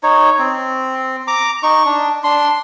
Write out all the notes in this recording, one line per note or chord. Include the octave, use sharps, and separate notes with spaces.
D#4 C#5
C4
A#5 D6
D#4 C#6
D4
D4 C6